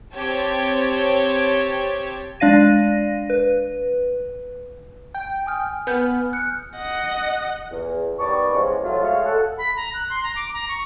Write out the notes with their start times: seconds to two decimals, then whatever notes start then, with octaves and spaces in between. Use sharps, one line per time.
0.14 C4 G4 C#5 G5 A5 G#6
2.40 G#3 D4 D5 F5 A#6 D#7
3.30 B4
5.14 G5
5.46 G#5 D#6 F6
5.87 B3 F6 G6
6.33 F#6 C#7
6.77 D#5 F#5
7.72 E2
8.19 D#3 G3 B3 D5 A5 C#6
8.53 E2 C#3 G#3 C4
8.83 F3 F#3 A3 C#4 F4
9.01 G#3 A3 C#5 F5
9.26 A4 F#5
9.58 B5
9.77 A#5
9.94 F#6
10.10 C6
10.23 A#5
10.36 D6
10.53 A#5
10.69 C#6